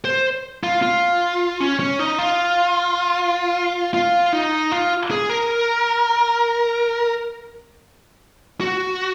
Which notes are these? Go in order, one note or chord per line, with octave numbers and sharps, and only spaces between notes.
C5
F4
F4
C#4
C#4
D#4
F4
F4
D#4
F4
G#4
A#4
F#4